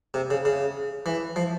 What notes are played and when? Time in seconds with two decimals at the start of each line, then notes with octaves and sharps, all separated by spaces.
0.14 C3
0.30 C#3
0.45 C#3
1.06 E3
1.36 F3